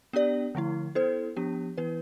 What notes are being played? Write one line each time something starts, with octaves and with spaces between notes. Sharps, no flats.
B3 D4 G4 D5
D3 F3 A3 E4
B3 E4 A4 C5
F3 B3 D4 G4
E3 B3 E4 B4